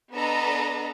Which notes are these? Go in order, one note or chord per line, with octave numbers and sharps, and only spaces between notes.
B3 D4 A4 B4 D#5 A#5